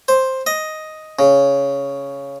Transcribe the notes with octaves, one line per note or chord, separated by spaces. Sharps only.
C5
D#5
C#3